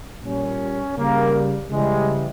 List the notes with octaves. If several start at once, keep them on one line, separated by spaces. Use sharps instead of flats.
A#2 G3 C#4
C#3 G3 A#3
C#3 E3 G3 G#3